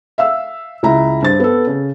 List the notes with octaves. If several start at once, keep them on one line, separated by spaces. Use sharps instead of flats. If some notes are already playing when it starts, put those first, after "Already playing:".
E5 F5 E6
C#2 E4 A#5
G2 C5 A6
B3 A4
C#3